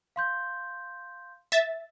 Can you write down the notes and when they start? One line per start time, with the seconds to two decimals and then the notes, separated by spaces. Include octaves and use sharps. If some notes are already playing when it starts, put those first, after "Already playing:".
0.16 F5 C6 G6
1.52 E5 A6